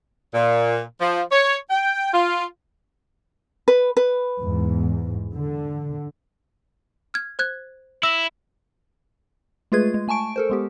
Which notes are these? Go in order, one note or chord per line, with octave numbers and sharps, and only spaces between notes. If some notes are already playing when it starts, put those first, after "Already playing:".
A#2
F3
C#5
G5
F4
B4
B4
E2 G#2
D3
F6 G#6
C5 F#6 G#6
E4 E6 A#6 F#7
G#3 A3 F4 G#4 B4 G#6
G#3
A3 G#5 A5 C#6 D7
A4 A#4 C5
G#3 B3 G4